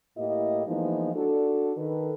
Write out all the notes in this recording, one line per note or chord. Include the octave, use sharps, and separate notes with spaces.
A2 A#3 E4 G4 D#5
E3 F3 G#3 A#3 B3 D#4
D4 F#4 A4
D#3 A4 B4